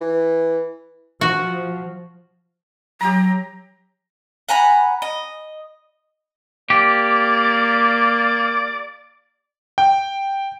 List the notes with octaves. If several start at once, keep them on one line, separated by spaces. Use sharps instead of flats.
E3
F3 F#4
F#3 G4 A#5
F#5 G#5 A#5 B5
D#5
A#3 G4 D5
G5